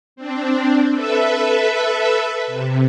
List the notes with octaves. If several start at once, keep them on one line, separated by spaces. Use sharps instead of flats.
C4 D4
A4 B4 E5
C3